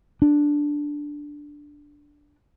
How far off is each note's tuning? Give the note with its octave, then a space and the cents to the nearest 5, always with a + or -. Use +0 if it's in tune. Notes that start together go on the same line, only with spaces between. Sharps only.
D4 +0